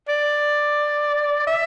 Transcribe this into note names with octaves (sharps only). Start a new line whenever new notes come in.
D5
E5